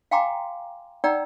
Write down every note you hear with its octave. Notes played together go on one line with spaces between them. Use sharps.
F5 G5 G#5 A#5 C6 D6
D#4 D5 F#5 G5 A#5 E6